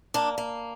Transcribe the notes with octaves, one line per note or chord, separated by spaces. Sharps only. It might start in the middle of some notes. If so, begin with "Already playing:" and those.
A#3 D4
A#3